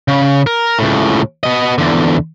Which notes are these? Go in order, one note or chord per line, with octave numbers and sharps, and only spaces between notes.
C#3
A#4
C#2 A2
B3 D#5
E2 D3